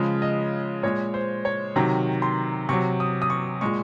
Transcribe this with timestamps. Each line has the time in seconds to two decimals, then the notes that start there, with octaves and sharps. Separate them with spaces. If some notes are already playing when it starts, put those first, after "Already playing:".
Already playing: C#3 F3 G#3
0.22 D#5
0.83 A#2 G#3 C#5
1.14 C5
1.45 C#5
1.76 C3 D#3 F#3 A#5
2.22 C6
2.69 C3 F#3 C#6
3.00 D#6
3.22 D#6
3.30 C#6
3.61 A#2 G#3 C#6